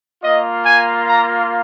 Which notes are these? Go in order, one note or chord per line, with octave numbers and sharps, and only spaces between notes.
A#3 F4 D#5
G#5
A#5